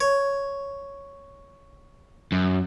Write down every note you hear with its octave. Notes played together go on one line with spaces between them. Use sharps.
C#5
F#2